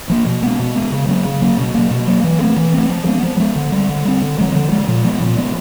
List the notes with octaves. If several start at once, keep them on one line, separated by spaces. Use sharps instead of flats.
F3 A#3
B2
G#3 B3
B2
G#3 B3
C#3
F#3 A#3 C#4
C#3
F#3 A#3 C#4
B2
F#3 A#3
B2
F#3 A#3
E3
A3 C4
E3
A3 C4
F3
G#3 B3
F3
G#3 B3
D3
G3 C4
D3
G3 C4
D3
F3 G#3
D3
F3 G#3
A#2
F3 G#3 B3
A#2
F3 G#3 B3